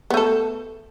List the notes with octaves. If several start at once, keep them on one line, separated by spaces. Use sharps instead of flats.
A3 B3 A4